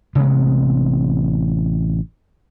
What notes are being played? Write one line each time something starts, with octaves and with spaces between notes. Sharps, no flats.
A1 C3 G#3 B3